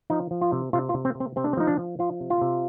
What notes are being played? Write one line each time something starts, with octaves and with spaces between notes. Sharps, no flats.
F3 D#4
F3
F4
C3
C3 F4
F4
C3
C4
C3
C4
C3 C4
D4
C4
F3 D#4
D4
F3
F3 F4
C3
F4
C3